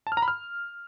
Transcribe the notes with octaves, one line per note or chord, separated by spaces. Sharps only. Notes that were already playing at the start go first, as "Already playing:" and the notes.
A5
F6
A#5
B5
F6